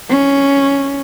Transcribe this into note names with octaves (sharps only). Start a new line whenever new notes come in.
C#4